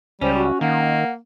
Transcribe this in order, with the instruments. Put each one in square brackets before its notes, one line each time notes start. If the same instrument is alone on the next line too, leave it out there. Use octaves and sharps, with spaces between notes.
[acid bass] C#2 [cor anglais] G3 [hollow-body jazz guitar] C#4 [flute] C5
[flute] F#4
[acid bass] D#3 [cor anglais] A#3 [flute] F#5